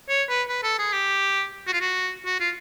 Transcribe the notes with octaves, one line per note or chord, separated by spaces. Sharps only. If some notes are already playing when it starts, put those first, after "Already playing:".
C#5
B4
B4
A4
G#4
G4
F#4
F4
F#4
F#4
F4